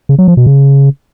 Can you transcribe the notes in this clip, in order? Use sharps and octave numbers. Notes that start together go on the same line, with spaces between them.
C#3
F#3
F3
B2
C#3